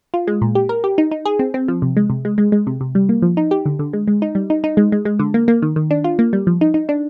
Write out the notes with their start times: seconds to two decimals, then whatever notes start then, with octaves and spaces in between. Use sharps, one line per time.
0.14 F4
0.27 G#3
0.42 A#2
0.55 G4
0.69 A#4
0.84 G4
0.98 D#4
1.11 D#4
1.26 G#4
1.39 C4
1.54 C4
1.68 F3
1.82 C3
1.97 G#3
2.10 C3
2.25 G#3
2.38 G#3
2.52 G#3
2.67 C3
2.81 C3
2.95 G3
3.09 A#3
3.22 F3
3.37 D#4
3.51 G4
3.66 D3
3.79 D3
3.93 G#3
4.08 G#3
4.22 D#4
4.35 G3
4.50 D#4
4.64 D#4
4.77 G#3
4.92 G#3
5.05 G#3
5.19 D3
5.34 A#3
5.48 A#3
5.62 D#3
5.76 D#3
5.91 D4
6.04 F4
6.19 A#3
6.33 G3
6.47 F3
6.61 D#4
6.74 D#4
6.89 D4